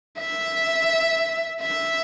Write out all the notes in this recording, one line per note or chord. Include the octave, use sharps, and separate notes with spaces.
E5
E5